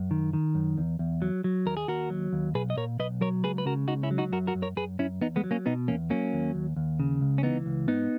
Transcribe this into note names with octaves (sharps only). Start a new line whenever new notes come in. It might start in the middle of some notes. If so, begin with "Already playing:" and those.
Already playing: F#2
D#3
D#3
F#2
E2
E2
F#3
F#3
D#2 A#4
G#4
D#2 F#4 A#4
F#3
D#2
B1 G#4 B4
D#5
A#2 A#4 C#5
B1 B4 D#5
F#3 A#4 C#5
C#2 G#4 B4
B4
C#3 F#4 A#4
C#2 D#4 F#4
C#4 E4
F#3
D#4 F#4
F#2 F#4 A#4
F#4 A#4
F#2
A#4 C#5
F#2 G#4 B4
F#2 C#4 E4
E2 B3 D#4
G#3 B3
F#3
A#3 C#4
B2 B3 D#4
E2 A#3 C#4
F#3 A#3 C#4
D#2
D#2
D#2
C#3
C#2
C#4
E3 B3 D#4
C#2
G#2 B3 D#4